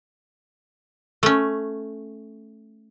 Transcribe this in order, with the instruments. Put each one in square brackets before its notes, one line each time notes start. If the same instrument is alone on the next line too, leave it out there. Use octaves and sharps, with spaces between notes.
[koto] A3 C#4